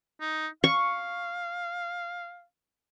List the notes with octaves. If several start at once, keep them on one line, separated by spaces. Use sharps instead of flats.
D#4
F5 C#6